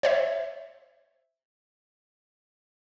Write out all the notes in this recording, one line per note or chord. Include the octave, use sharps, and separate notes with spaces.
C5 C#5 E5